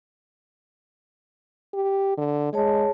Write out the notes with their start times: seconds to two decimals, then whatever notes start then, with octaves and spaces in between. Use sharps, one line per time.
1.74 G4
2.17 D3
2.53 G#3 G#4 C#5 A5